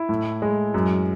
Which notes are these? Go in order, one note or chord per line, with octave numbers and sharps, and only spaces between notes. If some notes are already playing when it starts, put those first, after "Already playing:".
Already playing: E4
A2
G#3
F#2